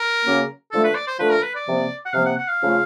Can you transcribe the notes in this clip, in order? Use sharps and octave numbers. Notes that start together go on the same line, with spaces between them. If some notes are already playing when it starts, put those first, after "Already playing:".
Already playing: A#4
C#3 F#3 A#3 C#4
D3 F3 A3 A4
B4
D5
C5
D3 F3 A3 B4
A#4
B4
D5
C3 F3 A#3
F#5
C3 F3 A#3 F5
F#5
F#5
F5
C#3 F3 A3 C#4 F4